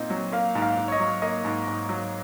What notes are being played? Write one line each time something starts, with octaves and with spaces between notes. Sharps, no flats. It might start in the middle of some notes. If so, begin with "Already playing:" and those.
Already playing: A#2 C4 D#4
F#3
A#3 F5
G#2
F5
G#2
C#5
D#5
F#3
A#3 D#5
G#2
G#2
F#3